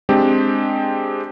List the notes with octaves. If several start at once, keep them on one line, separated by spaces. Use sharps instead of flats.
G#3 C4 D4 G4